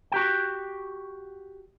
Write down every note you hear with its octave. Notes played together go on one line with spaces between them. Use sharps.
F#4 G4 G5